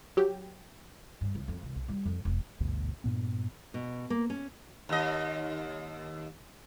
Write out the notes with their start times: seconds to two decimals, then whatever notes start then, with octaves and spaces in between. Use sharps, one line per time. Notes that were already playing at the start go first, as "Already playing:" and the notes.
0.17 F#3 G4
1.21 G2
1.35 C#2
1.48 F2
1.63 C2
1.75 B1
1.89 G3
2.05 F2
2.25 E1
2.60 G#1 D2 G2 B2
3.04 G2 A#2 B3
3.74 B2
4.10 A#3
4.30 C#4
4.89 D#2 D#5